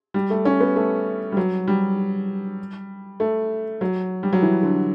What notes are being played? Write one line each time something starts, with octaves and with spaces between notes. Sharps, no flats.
G3
A3
C#4
B3
A3
G3
F#3
G3
A3
F#3
G3
F#3
E3
D3